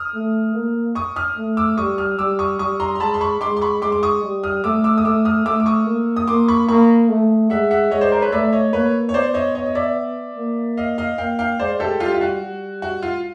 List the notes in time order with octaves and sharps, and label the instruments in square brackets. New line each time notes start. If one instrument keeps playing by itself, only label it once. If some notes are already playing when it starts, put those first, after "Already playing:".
Already playing: [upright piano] D#6 F6
[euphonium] A3
A#3
[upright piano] C#6 D#6
D#6 F6
[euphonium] A3
[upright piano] D6 E6
[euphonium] G3 [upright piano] C#6 D#6
[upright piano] D#6 F6
[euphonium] G3 [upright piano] D6 E6
[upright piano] C#6 D#6
[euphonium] G3 [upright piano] C#6 D#6
[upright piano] A#5 C6
C6
[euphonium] G#3 [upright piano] A5 B5
[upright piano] C6
B5 C#6
[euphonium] G#3 [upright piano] C6 D6
[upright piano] C6
B5 C#6
[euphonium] G#3 [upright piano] C6 D6
[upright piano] D6
C#6 D#6
[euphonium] G3
[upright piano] D#6 F6
[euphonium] A3 [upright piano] D6 E6
[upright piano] D6 E6
D#6
[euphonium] A3 [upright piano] D6 E6
[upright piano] D#6 F6
[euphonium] A3 [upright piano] D6 E6
[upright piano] D6
C#6 D#6
[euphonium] A#3
[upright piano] D#6
[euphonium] A#3 [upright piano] C6 D6
[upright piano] B5 C#6
[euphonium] A#3 [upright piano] B5 C#6
[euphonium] A3
[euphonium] G#3 [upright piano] E5 F#5
[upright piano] E5 F#5
[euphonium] G#3 [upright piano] C#5 D#5
[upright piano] C5 D5
A#4 C5
B4 C#5
[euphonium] A3 [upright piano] D5 E5
[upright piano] C#5 D#5
[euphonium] A#3 [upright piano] B4 C#5
[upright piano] C#5
[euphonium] B3 [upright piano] C5 D5
[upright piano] C#5 D#5
C#5 D#5
D#5
D5 E5
[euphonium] A#3
[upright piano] D#5 F5
D#5 F5
[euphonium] A#3 [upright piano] F5 G5
[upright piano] F5 G5
[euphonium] G#3 [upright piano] C5 D5
[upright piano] G4 A4
[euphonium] G3 [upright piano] F4 G4
[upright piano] F4
F#4
[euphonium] G3
[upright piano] F#4
F4